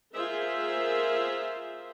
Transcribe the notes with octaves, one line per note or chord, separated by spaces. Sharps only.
F4 G#4 A#4 C5 E5